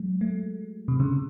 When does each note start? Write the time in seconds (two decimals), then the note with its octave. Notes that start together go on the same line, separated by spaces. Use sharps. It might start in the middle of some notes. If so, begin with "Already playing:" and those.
Already playing: F#3 G#3
0.21 A3
0.88 C3
1.00 C#3